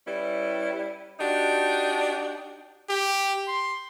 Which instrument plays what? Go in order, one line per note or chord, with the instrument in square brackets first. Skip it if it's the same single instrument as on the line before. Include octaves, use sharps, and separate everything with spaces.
[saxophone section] G3 C#4 E4 B4
D4 D#4 F#4 G4
[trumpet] G4
C6